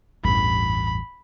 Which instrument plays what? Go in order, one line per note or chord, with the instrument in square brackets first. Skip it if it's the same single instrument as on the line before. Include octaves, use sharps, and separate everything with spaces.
[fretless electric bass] A1 E2 G2 [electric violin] B5